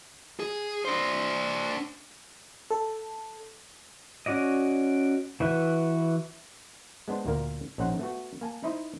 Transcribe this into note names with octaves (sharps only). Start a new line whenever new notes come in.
G#4
D4 C5
A4
C#4 F#4 D5 D#5
E3 F#4 B4 E5 F#6
G#3 B3 D4 C5
D2 A#2 A#3 A#4
A#1 C#4 D#4 C5 F#5
A3 B3 F#4
A#3 G#5 A5
D#4 E4 C5 D#5